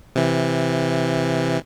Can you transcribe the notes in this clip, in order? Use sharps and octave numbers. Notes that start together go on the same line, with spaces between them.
C3 E3